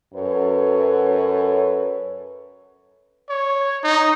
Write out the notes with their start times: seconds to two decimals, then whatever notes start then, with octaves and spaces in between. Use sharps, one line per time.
0.14 F#2 A4 B4 C#5
3.30 C#5
3.84 D#4